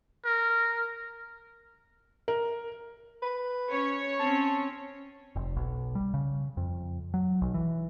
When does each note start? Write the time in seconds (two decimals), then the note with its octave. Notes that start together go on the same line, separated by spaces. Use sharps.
0.25 A#4
2.28 A#4
3.22 B4
3.69 C#4 C#5
4.20 C4 C#4 A5
5.36 F1
5.56 B1
5.95 G3
6.14 C#3
6.57 F2
7.14 F#3
7.42 B1
7.54 E3